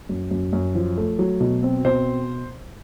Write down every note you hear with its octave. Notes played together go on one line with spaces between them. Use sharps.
F#2
F#2
F#2
F3
A3
F#3
B2
C4
B2 C5